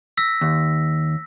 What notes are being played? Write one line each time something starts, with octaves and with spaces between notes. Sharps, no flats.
E6 A#6 B6
D#2